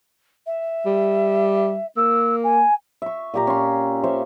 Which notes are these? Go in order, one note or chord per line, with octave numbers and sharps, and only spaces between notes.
E5
G3
A#3 E6
G#5
E5 C#6
A#2 G4 A#5
C#4 C6
C5 C#5 E5 F5